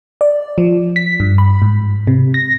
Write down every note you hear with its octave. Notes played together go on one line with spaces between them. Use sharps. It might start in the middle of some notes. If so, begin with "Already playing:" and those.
D5
F3
B6
G2
B5
G#2
C3
A#6